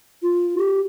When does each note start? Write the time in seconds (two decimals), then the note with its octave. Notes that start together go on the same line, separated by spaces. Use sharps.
0.23 F4
0.58 G4